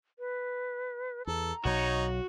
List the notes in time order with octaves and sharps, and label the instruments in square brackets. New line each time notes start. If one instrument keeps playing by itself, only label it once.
[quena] B4
[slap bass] E2 [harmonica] A4 [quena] A#5
[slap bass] B1 F#3 [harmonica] D#4 C#5 [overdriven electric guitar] F#4